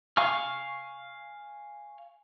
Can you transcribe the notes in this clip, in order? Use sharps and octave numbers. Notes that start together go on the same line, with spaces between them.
F5 G#5 C#6 F6